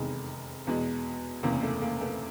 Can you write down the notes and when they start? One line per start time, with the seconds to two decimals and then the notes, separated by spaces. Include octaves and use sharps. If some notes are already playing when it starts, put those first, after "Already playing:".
Already playing: F1 E2 C3 D#3 G#3
0.67 E2 B2 G#3
1.43 F#1 E2 C3 A#3
1.63 A3
1.82 A#3
2.01 A3 B3